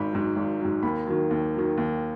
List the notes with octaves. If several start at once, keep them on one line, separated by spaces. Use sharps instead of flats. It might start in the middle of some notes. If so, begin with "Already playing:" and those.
Already playing: G#1 G#2 B5
G#2 F#3
G#1
F#3
G#2
D#2 B5
D#3 F#3
D#2
D#3 F#3
D#2